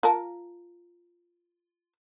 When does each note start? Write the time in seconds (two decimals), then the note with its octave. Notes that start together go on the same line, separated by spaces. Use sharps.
0.03 F4 A#4 A5